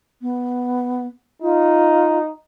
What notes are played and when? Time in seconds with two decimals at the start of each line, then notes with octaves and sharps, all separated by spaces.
0.22 B3
1.42 D#4 F4